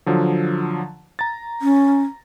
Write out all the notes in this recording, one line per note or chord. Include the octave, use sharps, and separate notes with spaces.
D3 F3 F#3
A#5 A6
C#4